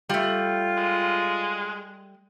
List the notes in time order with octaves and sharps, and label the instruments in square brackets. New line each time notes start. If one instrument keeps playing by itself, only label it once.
[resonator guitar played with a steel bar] G3 A3 [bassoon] F4
[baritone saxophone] G#3